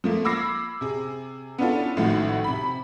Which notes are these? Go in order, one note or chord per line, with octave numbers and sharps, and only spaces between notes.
F3 A3 A#3
B5 D6 E6 G#6 A#6 C7
C3 G#4
B3 C#4 D4 E4 F4 A4
A1 A2 D#3 F3 F#4
C3 B5